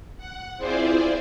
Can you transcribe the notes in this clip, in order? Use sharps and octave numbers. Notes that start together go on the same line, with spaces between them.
F#5
C4 E4 F4 G#4 C5 D5